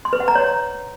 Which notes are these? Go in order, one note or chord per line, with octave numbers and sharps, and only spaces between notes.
C6
B4
F#5
A#5
C#5